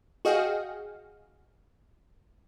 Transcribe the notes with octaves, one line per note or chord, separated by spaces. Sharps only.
F#4 G#4 D#5 F5 G5